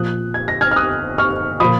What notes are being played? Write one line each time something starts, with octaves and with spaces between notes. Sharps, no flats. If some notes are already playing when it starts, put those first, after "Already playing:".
Already playing: A#2 F3 D#6 F#6
G#6
A#6
F6 G#6
F6
D#6 F#6
C#6 F6
A#2 F3 B5 D#6